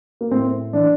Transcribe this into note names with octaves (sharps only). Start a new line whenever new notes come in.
A#3
A2 C4
E3 D4